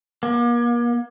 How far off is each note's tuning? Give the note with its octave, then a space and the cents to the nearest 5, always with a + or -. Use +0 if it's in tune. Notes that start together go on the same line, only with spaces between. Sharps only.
A#3 +40